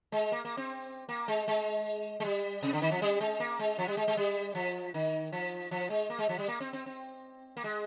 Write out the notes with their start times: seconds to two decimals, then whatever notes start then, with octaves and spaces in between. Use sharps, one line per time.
0.12 G#3
0.32 A#3
0.45 A#3
0.57 C4
1.09 A#3
1.28 G#3
1.48 G#3
2.20 G#3
2.25 G3
2.62 C3
2.73 D3
2.82 D#3
2.91 F3
3.02 G3
3.20 G#3
3.40 A#3
3.59 G#3
3.78 F3
3.88 G3
3.97 G#3
4.08 G#3
4.17 G3
4.55 F3
4.94 D#3
5.32 F3
5.71 F3
5.90 G#3
6.10 A#3
6.18 G#3
6.29 F3
6.38 G3
6.48 A#3
6.60 C4
6.73 C4
6.86 C4
7.57 A#3
7.64 G#3